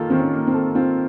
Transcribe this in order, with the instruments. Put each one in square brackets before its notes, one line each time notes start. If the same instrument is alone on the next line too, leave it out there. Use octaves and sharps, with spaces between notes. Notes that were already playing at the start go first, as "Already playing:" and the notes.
Already playing: [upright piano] D#3 A#3 F4 A4
[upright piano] D#3 [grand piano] C4
[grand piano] C#4
[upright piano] A#3
[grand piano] C4
[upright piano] A4
[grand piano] C4 [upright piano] F4